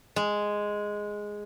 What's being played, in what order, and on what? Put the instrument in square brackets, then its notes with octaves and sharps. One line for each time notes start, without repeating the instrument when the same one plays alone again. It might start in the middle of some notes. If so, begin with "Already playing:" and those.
[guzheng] G#3